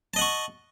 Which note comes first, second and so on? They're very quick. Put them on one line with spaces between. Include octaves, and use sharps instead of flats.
A5 D#5 F#5 C#6